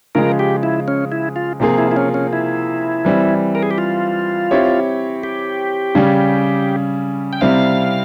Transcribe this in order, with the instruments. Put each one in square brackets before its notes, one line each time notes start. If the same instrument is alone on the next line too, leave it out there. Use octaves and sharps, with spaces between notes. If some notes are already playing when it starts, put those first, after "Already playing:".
[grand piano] C#3 F3 G#3 [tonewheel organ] A#4
[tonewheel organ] G4
E4
C#4
E4
F4
[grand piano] C3 F3 A#3 F4 G#4
[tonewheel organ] E4
E4
C#4
C#4
E4
[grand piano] E3 G3 C4
[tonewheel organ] A#4
G#4
G4
F4
[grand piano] C4 E4 G4 C#5
[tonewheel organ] G4
[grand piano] C#3 G3 C#4
[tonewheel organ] G5
[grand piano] C3 G3 C4 E4 [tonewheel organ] F5